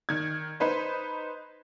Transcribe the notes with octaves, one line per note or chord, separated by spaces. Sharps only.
D#3 G#6
D#4 B4 C5